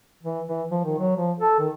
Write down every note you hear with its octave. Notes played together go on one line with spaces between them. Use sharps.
E3
E3
F3
D#3
F#3
F3
A4
D#3